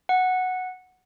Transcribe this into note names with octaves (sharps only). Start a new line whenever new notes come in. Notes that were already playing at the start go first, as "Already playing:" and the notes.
F#5